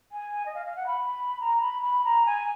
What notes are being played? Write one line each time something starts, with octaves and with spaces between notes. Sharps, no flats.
G#5
D#5
F5
F5
F#5
B5
A#5
B5
B5
A#5
G#5